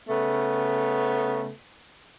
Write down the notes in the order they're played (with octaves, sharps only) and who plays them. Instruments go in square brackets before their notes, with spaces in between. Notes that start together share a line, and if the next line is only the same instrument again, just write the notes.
[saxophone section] C#3 A3 B3